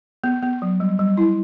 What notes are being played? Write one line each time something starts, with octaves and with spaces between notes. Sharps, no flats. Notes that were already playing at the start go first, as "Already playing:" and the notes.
B3
B3
F#3
G3
G3
E4